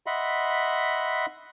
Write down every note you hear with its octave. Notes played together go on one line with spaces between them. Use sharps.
D#5 E5 F#5 B5 C6